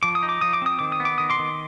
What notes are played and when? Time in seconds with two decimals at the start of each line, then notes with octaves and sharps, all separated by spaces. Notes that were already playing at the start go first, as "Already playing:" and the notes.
0.03 F3 D6
0.15 D#6
0.23 D#4
0.29 D6
0.41 F3 D#6
0.53 D6
0.62 C4 D#6
0.79 D#3 D6
0.92 D#6
1.00 B3
1.05 D6
1.18 D#3 D#6
1.30 C6 D6
1.39 D#3